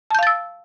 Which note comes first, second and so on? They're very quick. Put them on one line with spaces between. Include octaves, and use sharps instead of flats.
A5 G6 F5 A6 E6